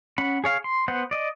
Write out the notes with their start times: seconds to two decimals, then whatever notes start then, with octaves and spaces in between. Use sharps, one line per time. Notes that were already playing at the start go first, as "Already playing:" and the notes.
0.18 C#4 F#5 B5
0.44 G#4 C#5 F5
0.64 C6
0.88 B3 C5 F#5
1.11 D5 D#5